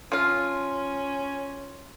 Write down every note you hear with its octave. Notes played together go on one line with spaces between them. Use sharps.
F3 C#4 F4